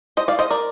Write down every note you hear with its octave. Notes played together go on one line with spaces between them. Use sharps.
C5 D#5
D5 F5
C5 D#5
A#4 D5